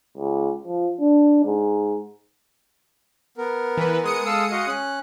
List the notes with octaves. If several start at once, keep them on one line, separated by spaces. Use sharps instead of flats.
C#2
F3
D4
G#2
B3 A#4
E3 B4
G#3 D#6 C#7
A4 F5 E6
F#4 D#5 F5
C#4 F#6